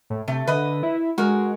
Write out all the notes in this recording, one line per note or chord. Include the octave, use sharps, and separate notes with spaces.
A2
C3 A3
D3 B4 D#5
E4
G#3 F#4 A#4